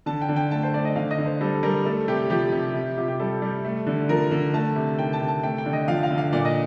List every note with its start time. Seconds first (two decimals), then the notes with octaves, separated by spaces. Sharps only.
0.06 D3 A5
0.21 G5
0.29 D3
0.36 G5
0.51 A3 A5
0.63 C5
0.74 A3 D5
0.85 D#5
0.96 D3 F5
1.11 D#5
1.18 D3
1.25 C5
1.41 G3 A4
1.63 G3 A#4
1.85 A3 A4
2.08 C3 G4
2.30 F3 G4
2.52 C3
2.74 C3
2.97 C3 F4
3.08 G4
3.19 G3 A4
3.42 G3
3.65 A3
3.87 D3
4.09 F3 A#4
4.31 D3
4.54 A3 A5
4.76 C3
4.99 D#3 G5
5.13 A5
5.21 C3
5.28 A5
5.43 A3 G5
5.58 G5
5.66 D3
5.73 D#5
5.88 F3 F5
6.03 F5
6.10 D3
6.18 F5
6.33 A#2 D5
6.45 D#5